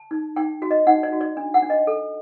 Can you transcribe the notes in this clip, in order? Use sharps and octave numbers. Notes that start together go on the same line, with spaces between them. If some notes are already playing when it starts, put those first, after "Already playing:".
Already playing: A5
D#4
D#4 G5
F#4
D#5
D#4 F#5
D5
F#4
D5
D4
F#5
D4
D#5
A4